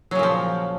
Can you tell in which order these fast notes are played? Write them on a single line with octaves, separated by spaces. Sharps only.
F#3 C#3 A#2 F3